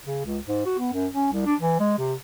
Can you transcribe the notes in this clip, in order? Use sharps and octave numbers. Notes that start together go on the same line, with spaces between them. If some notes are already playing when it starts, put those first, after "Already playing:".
C#3
C#2
G#2
F#4
B3
F#2
C#4
C2
D4
E3
G#3
C3